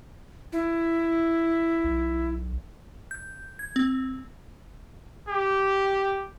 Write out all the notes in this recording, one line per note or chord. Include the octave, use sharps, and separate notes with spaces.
E4
B1
G6
G#6
C4
G4